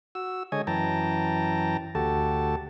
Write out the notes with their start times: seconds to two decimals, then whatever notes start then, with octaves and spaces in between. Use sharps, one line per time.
0.15 F#4 E6
0.52 D3 G#3 C#5 D#5 G#5
0.67 F#2 E3 G5 A5 A#5
1.95 D2 F#4 G4 A4 A5